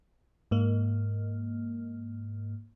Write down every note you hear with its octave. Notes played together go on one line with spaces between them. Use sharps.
G#2 A#3